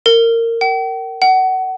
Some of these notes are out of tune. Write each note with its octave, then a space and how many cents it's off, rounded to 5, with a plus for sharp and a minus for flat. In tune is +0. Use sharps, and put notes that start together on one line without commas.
A#4 -20
G5 -45
F#5 +25